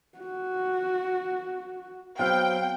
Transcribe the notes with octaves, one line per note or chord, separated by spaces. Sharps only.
F#4
F#3 B3 C4 F5 G5